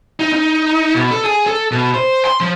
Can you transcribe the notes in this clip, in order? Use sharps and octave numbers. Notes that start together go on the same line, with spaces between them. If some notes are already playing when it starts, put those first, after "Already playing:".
D#4
D#4
B2
A4
G#4
A4
B2
C5
C6
F3